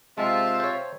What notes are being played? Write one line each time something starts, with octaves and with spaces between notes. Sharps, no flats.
C3 G#3 C4 F4 E5 A5
C5 C#5